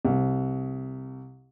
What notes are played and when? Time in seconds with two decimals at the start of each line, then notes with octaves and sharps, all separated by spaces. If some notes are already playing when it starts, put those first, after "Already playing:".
0.05 C2